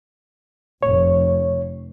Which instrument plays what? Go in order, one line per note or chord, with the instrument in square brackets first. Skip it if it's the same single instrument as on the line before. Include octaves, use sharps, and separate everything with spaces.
[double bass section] F1 [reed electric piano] C#5